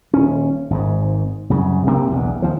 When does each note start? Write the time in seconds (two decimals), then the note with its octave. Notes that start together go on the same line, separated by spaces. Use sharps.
0.13 D#1 C#4
0.70 G#1 G#2
1.50 C2 F#2 C#3
1.87 C3 A#3 C4
2.09 B1 E2 G2
2.42 D#2 F3